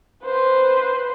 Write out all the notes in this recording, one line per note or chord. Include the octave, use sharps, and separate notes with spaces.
B4 C5